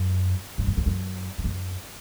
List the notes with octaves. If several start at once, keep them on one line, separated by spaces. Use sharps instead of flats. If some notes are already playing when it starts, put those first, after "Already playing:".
Already playing: F#2
G2
F#2
E2
F#2
E2
F#2